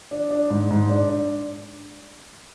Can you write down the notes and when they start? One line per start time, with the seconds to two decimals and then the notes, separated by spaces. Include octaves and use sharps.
0.11 D4
0.31 D4
0.50 G#2
0.71 G#2
0.89 D4
1.09 D4